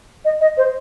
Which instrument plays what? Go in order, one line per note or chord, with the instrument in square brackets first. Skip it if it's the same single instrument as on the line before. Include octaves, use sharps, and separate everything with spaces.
[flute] D#5
D#5
C5